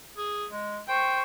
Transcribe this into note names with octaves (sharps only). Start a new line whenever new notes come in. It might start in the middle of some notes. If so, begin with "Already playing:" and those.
G#4
G#3
C5 G5 C#6